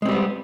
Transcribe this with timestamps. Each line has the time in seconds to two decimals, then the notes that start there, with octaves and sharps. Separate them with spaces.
0.02 G#3
0.05 C4
0.09 G3
0.12 B3